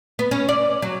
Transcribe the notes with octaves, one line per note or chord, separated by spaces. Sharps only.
B3
C#4
D5
F#3